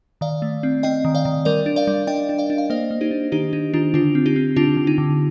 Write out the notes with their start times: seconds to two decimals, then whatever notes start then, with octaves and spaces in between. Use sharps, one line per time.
0.21 D#3 D5 F5
0.42 A3
0.63 C4
0.83 C4 D#5 G5
1.05 D#3
1.15 D5 F5
1.25 D#3
1.45 G3 A#4 D5
1.66 D4
1.76 D5 F5
1.87 G3
2.07 D4 D#5 G5
2.29 D4
2.38 D5 F5
2.50 D4
2.58 F5
2.70 A#3 C5 D#5
2.91 A#3
3.01 D#4 G4
3.11 D4
3.32 D#3 D#4 G4
3.53 D4 D#4
3.73 D#3 D4 F4
3.94 D3 D4 F4
4.15 C4
4.26 D#4 G4
4.36 C4
4.56 D3 D4 F4
4.77 D3
4.87 D#4
4.98 D3